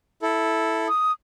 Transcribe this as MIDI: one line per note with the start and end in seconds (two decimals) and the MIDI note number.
0.22 0.88 64
0.22 0.88 69
0.88 1.12 87